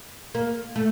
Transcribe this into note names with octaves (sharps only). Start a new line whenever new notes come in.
A#3
A3